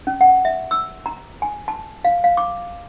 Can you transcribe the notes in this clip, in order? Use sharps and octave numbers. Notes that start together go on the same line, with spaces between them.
C#4
F#5
E5
E6
A#5
G#5
A5
F5
F5
D6